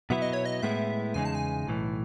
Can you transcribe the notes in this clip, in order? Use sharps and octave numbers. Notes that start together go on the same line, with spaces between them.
B2 F#3 B3 E4 E5
D#5
C#5
D#5
A2 G#3 B3 E4 E5
E2 C#3 G#3 D#4 G#5
A5
G#5
B1 A2 E3